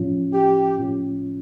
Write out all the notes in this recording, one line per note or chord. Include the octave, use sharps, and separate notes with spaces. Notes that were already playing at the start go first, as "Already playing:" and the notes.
Already playing: A2 F3 C#4 F4
G4
A2 F3 C#4 F4